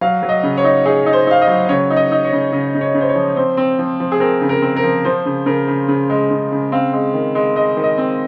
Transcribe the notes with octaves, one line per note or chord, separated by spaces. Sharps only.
F#3 F5
F#3
D#5
C#3
C#5
D#4
D#4 G#4
D#4
C5
D#4 F5
D#5
F#3
C#3 C#5
D#4
D#5
D#4
C#5
C#3
C#3
C#3
C#5
C#3
C5
C#5
F3
C4 C5
C4
F3
F3
G#4
C4 A#4
C#3
A#4
C4
A#4
F3
F3 C5
C#3
C#3 A#4
C#3
C#3
G#3
C#3
C#3
C4 F5
G#3
D#3
G#3
G#3 D#5
D#3
D#5
C4